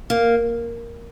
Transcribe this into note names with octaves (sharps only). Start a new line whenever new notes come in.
A#3